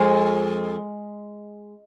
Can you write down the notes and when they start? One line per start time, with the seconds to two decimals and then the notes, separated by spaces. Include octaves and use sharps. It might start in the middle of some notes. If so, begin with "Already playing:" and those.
Already playing: F2 G#3